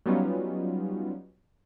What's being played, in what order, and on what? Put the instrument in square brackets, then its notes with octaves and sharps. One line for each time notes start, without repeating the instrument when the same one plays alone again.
[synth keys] F#3 G3 B3 C#4 D#4 F4